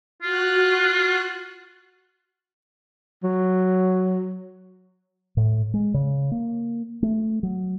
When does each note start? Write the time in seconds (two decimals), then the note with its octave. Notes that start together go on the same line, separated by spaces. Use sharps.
0.23 F4 F#4 F#6
3.23 F#3
5.37 A2
5.74 G#3
5.94 C#3
6.32 A#3
7.03 A3
7.43 F#3